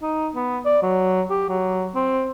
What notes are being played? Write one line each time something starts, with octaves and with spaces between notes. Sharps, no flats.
D#4
B3
D5
F#3
G4
F#3
C4